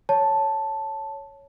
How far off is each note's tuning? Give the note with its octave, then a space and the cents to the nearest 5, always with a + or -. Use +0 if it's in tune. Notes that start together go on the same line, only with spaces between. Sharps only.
C#5 +0 A5 +0